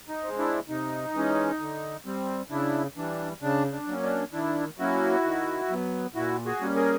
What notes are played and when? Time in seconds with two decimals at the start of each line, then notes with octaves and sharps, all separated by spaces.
0.09 D#4
0.23 G#3 C4
0.38 D4 E4
0.69 C3 D#4
1.14 E3 G#3 C#4
1.60 D3
2.06 G3 C4
2.50 C#3 D4 E4
2.96 E3 G3 D4
3.42 C#3 D4
3.72 D4
3.87 F#3 A#3 C#4
4.03 D4
4.33 D#3 D4 E4
4.79 F#3 A#3 C#4 E4 F#4
5.24 D#3
5.69 F#3 B3
6.15 A#2 E4 F#4
6.45 F#4 G#4
6.61 G3 A#3 C#4
6.76 G#4 A#4